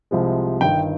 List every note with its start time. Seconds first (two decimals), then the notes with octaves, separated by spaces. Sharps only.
0.11 C2 C3 F3 G#3
0.60 G1 G2 D#3 G5